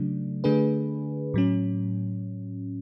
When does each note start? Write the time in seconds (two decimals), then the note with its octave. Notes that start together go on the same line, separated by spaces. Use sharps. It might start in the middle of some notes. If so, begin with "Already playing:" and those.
Already playing: C#3 F#3 A3 D4
0.44 D3 A3 D4 G#4 B4
1.34 A2 F#3 C#4